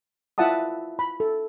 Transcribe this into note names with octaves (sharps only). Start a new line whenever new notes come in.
E4 F4 E5 F#5 A5 D#6
B5
A4